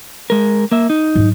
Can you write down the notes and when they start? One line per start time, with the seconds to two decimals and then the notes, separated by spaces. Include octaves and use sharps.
0.30 G#3 A#4
0.71 A#3 E5
0.90 D#4
1.15 G#2 F#3